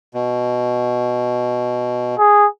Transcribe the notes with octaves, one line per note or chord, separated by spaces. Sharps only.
B2
G#4